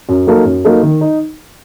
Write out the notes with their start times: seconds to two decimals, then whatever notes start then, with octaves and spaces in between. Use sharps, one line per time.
0.09 F#2
0.27 F#3 A#3 D#4 A4
0.45 F#2
0.64 F#3 A#3 D#4 A4
0.83 D#3
1.01 D#4